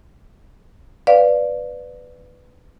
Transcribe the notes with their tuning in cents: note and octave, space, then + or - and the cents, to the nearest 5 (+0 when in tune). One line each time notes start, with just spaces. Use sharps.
B4 +10 D5 +0 F5 +0